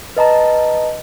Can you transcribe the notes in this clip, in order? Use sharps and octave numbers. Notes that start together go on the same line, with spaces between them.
B4 D#5 A5 A#5